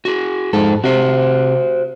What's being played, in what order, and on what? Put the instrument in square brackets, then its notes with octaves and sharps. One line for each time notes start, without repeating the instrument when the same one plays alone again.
[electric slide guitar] F#4 G#4
[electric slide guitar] F2 A4 [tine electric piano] G#2
[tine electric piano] C3 [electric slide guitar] F#4 C5